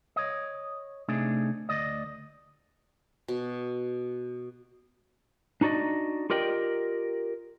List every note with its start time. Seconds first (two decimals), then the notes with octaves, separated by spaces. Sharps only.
0.16 C#5 D#5
1.08 C3 A3 D4 D#4 G#4
1.69 D2 D5 D#5
3.28 B2
5.61 D4 D#4 F#4 D5 D#5
6.30 F4 G4 A#4 D5 D#5 G5